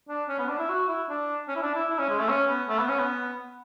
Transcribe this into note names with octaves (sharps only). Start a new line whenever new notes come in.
D4
C#4
B3
D4
E4
F#4
E4
D4
C#4
E4
D4
E4
E4
C#4
G#3
A3
C#4
B3
A3
B3
C#4
B3